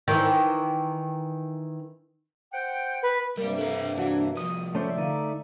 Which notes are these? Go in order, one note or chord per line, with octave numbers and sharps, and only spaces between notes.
D#3 E3
C5 F#5 G5
B4
G2 C3 G3 A#3 A#4 D5
D4 A4 A#4
E3 D4 F#4 F#5
C2 F3 D#6
A3 C#4 C5 D5 E5
D3 A3 D#4 F5